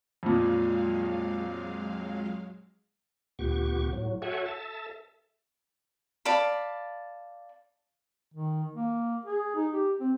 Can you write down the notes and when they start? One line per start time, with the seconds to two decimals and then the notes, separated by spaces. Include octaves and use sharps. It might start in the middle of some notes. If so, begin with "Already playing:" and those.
0.23 F2 A#2 F#3 G#3 F5
3.39 D2 A#2 B3 G4 C#6
3.93 A2 F#3
4.22 F#4 A4 C#5 E5 F#5 G#5
4.46 A4 E5 A5
6.25 D5 F5 A5 B5
8.34 D#3
8.75 A#3
9.25 G#4
9.56 D#4
9.73 G4
10.00 C4